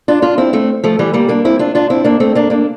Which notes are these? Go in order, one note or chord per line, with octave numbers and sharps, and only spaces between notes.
D4 F4
D4 F4
C4 E4
A3 C4
F3 A3
E3 G3
G3 A#3
A#3 D4
C4 E4
D4 F4
D4 F4
C4 E4
A#3 D4
A3 C4
A#3 D4
A#3 D4